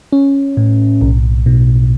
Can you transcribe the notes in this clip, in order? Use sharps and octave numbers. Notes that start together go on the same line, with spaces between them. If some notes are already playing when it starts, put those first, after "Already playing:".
C#4
A2
B1
B2